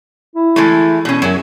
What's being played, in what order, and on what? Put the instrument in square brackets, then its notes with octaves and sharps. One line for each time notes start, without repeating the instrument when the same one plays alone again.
[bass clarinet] E4
[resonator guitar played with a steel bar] E3 G#3 A3
B2 C#4
[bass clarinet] F#2 [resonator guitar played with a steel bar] F#3 G#4